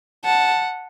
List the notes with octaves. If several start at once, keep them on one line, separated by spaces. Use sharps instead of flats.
F#5 A5